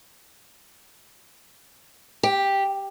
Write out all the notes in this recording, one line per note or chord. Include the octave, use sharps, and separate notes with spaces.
G4